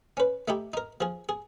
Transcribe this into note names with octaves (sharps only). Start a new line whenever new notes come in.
C#4 B4
A3 D#4 E4 G4
D#4 A#4
F3 G#4
G#4